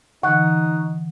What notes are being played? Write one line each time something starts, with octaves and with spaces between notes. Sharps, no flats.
D3 E3 D#4 F#5 C#6 F#6